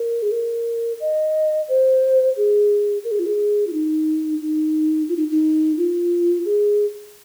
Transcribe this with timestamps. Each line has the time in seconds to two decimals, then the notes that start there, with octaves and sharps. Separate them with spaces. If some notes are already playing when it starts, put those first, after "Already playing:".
Already playing: A#4
0.22 G#4
0.31 A#4
1.00 D#5
1.69 C5
2.37 G#4
3.04 A#4
3.11 G#4
3.19 F4
3.26 G#4
3.67 F4
3.73 D#4
4.41 D#4
5.09 F4
5.17 D#4
5.31 D#4
5.77 F4
6.45 G#4